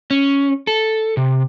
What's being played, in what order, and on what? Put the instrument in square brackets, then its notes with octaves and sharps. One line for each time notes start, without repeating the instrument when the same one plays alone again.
[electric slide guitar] C#4
A4
C3